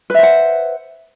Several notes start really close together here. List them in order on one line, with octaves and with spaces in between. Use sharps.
B4 E5 C5 F#5